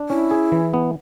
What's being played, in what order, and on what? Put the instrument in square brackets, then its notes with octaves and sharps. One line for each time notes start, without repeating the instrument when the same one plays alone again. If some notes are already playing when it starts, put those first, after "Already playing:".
Already playing: [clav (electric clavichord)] D4
[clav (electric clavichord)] C#4 [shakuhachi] E4
[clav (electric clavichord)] G#4
E3
B3